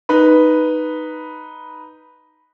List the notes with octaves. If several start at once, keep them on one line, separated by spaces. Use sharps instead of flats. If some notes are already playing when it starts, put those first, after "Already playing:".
D#4 B4 B5